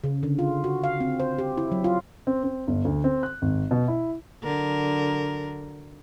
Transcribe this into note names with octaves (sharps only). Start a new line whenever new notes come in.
C#3
D3
F4
F#4
F5
C4
C5
G4
E4
F#3
F4
C4
C4
G1
D2
C4
F#6
G#1
B2
E4
D3 F#3 A#4